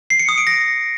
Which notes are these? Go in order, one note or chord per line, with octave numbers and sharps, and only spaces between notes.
C7
C#7
D#6
D7
A#6